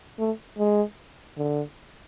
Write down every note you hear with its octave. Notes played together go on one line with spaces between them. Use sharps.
A3
G#3
D3